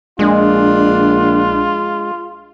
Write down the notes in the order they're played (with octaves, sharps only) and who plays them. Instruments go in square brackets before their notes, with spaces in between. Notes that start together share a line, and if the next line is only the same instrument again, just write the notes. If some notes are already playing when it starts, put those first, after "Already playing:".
[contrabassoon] A#1 [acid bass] G#3 [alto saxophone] D4 [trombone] F4